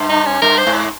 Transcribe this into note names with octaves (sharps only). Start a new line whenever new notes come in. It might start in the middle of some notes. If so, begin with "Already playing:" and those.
Already playing: G2
D#4
C#4
G2 A#4
C5
G#2